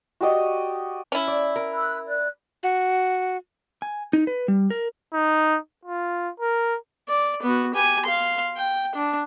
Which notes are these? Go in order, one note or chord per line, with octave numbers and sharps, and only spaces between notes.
F#4 G4 D5 D#5
C#4 E4
D5
A#4
B5 E6 F#6
D5 F#6
F#4
G#5
D#4
B4
G3
A#4
D#4
F4
A#4
D5
B3 F#4
G4 G#5
F5 C6
G5
D4